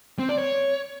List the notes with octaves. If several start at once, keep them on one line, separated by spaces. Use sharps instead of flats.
C4
D5
C#5